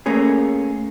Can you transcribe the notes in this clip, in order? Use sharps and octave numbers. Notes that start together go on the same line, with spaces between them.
A3 A#3 C#4 G#4